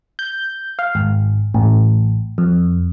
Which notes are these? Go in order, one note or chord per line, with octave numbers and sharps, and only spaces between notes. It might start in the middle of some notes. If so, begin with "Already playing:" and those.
G6
F5
G#1
A1
F2